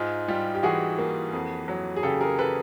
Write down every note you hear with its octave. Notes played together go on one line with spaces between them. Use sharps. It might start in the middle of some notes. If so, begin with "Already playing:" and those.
Already playing: G#2 D#4 F4
G3 F4 G4
G4
E3 F#4 G#4
A#3
F2
F#3
G#4
C#3 G4 A4
G#4 A#4
A4 B4